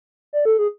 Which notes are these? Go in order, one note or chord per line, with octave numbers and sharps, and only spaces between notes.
D5
A4
G#4